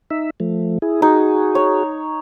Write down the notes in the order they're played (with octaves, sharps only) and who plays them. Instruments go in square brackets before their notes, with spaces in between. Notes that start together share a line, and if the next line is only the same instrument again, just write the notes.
[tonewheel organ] D#4 E5
F3 A3
E4 G#4
[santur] D#4 [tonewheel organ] F#4 G#4
[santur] C#5